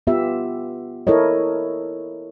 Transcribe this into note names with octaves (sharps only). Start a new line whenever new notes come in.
B3 F4 G4 E5
E4 A4 A#4 C#5 D#5